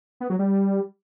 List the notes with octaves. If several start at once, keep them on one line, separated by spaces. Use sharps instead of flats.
B3
F#3
G3